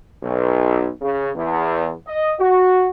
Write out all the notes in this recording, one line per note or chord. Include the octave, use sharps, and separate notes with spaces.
B1
C#3
E2
D#5
F#4